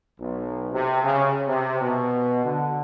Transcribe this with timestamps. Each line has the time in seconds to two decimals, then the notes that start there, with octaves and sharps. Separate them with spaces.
0.19 B1
0.73 C3
1.03 C#3
1.48 C3
1.81 B2
2.45 D3